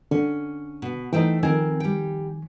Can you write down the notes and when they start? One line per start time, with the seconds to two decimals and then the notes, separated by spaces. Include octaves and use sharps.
0.11 D3 C#4
0.82 B2
1.13 E3 A3 D#4 C5 G5
1.43 F2 D#3 C4 A#4 G#5
1.80 G3 G5